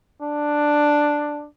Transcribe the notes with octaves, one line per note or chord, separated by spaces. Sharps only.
D4